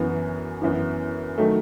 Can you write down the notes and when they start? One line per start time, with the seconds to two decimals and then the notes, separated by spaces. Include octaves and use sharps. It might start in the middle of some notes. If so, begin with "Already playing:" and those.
Already playing: F#2 E3 B3
0.61 F#2 E3 B3 E4
1.38 D#3 F#3 A3